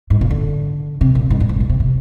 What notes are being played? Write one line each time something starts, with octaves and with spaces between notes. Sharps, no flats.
G#2
A#2
D3
C3
A#2
G#2
G2
G#2
A#2
C3
C3